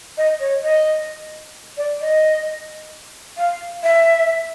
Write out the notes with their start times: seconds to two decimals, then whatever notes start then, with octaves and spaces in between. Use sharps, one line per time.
0.17 D#5
0.40 C#5
0.63 D#5
1.77 D5
2.01 D#5
3.37 F5
3.83 E5